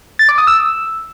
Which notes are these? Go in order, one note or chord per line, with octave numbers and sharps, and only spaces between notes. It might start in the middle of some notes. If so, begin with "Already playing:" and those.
A6
D6
D#6
E6